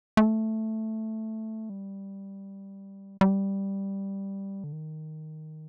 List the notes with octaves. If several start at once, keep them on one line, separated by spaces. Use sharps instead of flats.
A3
G3
G3
D3
D#3